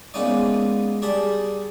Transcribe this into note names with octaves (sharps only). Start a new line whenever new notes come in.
G#3 A#3 B3 C#4 D#4 D5
G3 G#4 D5 A5 B5 C6